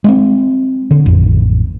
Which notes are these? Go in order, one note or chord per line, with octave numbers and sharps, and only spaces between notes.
G#3 A#3 C4
D3
A1 F2